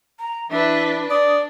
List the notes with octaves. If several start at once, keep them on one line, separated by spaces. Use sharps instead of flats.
A#5
E3 D4 B4 E5
D4 D5 D#6